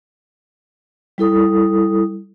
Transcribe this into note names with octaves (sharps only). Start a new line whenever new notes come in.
G3 E4 A4 D#6